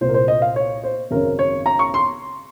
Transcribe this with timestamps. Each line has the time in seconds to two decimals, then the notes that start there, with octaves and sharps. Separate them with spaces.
0.01 C2 A#2 C5
0.09 A#4
0.14 C5
0.28 D#5
0.42 F5
0.56 C#5
0.84 C5
1.11 G#1 F#2 C#3 A#4
1.39 C#5
1.66 A#5
1.79 C#6
1.94 C6